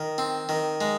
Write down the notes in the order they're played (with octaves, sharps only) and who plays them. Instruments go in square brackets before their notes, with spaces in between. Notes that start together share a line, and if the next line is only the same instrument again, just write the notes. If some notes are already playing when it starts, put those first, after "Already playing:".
Already playing: [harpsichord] D#3
C4
D#3
G#3